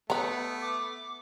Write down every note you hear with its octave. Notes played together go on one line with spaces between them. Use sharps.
A3 B3 A#5 B5
D6